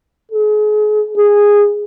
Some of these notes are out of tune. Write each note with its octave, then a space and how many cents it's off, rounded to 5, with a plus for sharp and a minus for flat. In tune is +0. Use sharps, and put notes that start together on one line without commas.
G#4 +35
G#4 -10